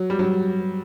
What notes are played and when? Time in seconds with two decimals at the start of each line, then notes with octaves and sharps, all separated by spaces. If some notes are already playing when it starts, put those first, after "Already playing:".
Already playing: F#3
0.10 G3
0.19 F#3